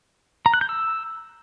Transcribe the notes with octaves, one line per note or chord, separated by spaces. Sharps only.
A#5
F#6
G6
E6